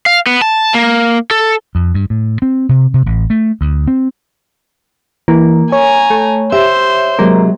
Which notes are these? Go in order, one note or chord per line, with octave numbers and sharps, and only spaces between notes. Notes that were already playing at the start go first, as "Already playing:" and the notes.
F5
B3
A5
A#3
A4
F2
G2
A2
C4
C3
C3
A1
A3
D2
C4
E3 A#3
C#5 G#5 A#5
A3
G4 C5 E5
C3 F#3 G#3 A#3